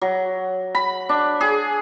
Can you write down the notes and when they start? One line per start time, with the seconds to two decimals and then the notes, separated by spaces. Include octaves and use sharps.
0.01 F#3
0.75 B5
1.09 D4
1.41 G#4